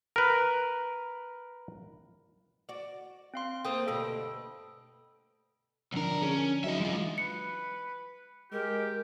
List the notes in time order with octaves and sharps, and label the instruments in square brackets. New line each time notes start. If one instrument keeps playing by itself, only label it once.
[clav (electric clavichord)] A#4 B4
[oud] F#4 D5
[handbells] C4 F5 C6
[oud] A3 A#3 C5 [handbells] G5 D#6
[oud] D2 G2 B2 [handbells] A4
[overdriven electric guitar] B1 A#4 [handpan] D3 F3 D4
[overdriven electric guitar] C#4 [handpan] G#4
[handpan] F#3 F#4 D#5 [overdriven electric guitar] D#4 E5
[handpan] E3 [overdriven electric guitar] G#3 F4
[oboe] B4 [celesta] C#7
[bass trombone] G#3 [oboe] G4 [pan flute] A#4